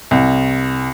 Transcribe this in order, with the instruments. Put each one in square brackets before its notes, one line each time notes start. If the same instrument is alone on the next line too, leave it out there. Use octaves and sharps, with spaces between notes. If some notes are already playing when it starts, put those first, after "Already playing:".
[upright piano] C2